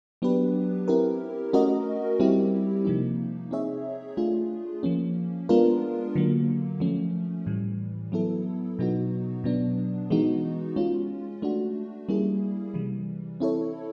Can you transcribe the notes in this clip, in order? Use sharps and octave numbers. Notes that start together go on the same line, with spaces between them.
F#3 B3 D4 G4 B4
C4 E4 G4 A#4
A3 C#4 F#4 A#4 D#5
G3 C4 E4 G4
C3 F3 A#3 D#4
C4 D#4 G#4 C#5 E5
A3 D4 F4 G#4
F3 A#3 C#4
G#3 B3 D4 F4 A#4
D3 F#3 A#3
F3 A3 C#4
A2 E3 G3
F#3 B3 E4 A4
B2 F#3 B3 D#4 F#4
B2 F#3 B3 D4
E3 G#3 B3 D#4 F#4
G#3 C#4 F4
A3 D4 F#4
G3 A#3 C#4 E4 G#4
C3 E3 G3
C4 E4 A4 C#5